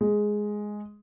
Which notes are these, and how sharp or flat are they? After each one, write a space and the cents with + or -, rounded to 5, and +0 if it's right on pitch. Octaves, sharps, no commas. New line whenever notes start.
G#3 +5